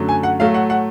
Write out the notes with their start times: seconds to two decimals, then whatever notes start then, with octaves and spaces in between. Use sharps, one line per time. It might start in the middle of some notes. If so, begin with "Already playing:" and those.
Already playing: F#2 D3 F#3 A3
0.09 G#5
0.23 F#5
0.39 A2 F#3 A3 F5
0.54 F#5
0.70 F#5